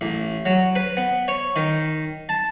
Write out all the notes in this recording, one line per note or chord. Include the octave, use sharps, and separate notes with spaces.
A1
F#3
B4
B3
C#5
D#3
A5